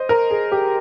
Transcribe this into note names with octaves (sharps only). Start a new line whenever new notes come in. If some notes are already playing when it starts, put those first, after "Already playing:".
Already playing: C5 D#5
A#4
G#4
G4